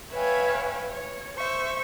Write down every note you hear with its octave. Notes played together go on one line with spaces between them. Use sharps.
B4 C#5 E5 F5 G5 G#5
C#5
C5 E5 C#6